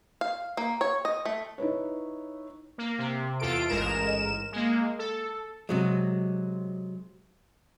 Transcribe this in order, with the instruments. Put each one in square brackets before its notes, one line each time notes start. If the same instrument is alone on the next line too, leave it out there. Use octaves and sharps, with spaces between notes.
[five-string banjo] F5
A#3
C#5
D#5
A3
[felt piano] D#4 E4 B4 C#5
[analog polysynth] A#3
C3
E2 F4 A4 D7
A1 G#2 G#3 A#4 E7
G#3 A#3
A4
[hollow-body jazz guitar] C3 F#3 G#3